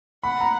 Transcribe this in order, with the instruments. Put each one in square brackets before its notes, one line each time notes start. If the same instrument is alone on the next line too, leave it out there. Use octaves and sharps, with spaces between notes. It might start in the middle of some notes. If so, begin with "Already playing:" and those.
[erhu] F#5 [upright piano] B5
[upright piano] A#5